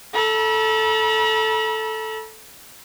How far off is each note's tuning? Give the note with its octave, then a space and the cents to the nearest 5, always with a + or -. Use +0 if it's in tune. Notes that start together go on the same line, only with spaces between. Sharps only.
A4 -5 B5 -45